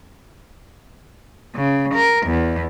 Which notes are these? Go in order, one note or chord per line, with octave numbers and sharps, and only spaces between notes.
C#3
A#4
E2